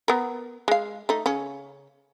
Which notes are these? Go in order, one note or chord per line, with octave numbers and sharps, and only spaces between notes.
B3 A#4
G#3 F5
A3 D#4
C#3 C#4